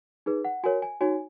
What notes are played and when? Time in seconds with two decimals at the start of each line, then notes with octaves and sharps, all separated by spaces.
0.26 D#4 G#4 B4
0.45 F#5
0.64 F#4 A#4 C#5 G#5
0.82 G#5
1.01 D#4 F#4 C#5 G#5